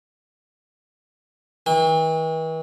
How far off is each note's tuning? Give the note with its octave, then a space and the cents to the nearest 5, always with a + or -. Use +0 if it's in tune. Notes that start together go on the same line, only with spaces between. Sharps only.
E3 -45 G5 +45